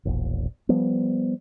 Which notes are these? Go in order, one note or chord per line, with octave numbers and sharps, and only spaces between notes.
E1 A#1
F3 G3 B3